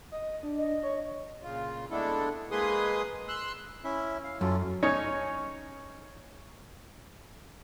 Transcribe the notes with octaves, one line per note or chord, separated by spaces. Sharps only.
D#5
D4
D#5
C#5
A#2 C#3 F4
G#3 A3 B3 D4 E4 A4
G#3 A#3 G#4 B4 C6 D#6
C6 E6 F#6
C#4 E4 E5
F5
F#2 C#4 F4 A4
C#4 D#4 C#5